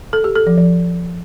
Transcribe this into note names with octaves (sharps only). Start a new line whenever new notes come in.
A4
G4
A4
F3
F3